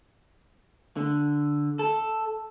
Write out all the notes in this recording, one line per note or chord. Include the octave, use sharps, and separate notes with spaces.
D3
A4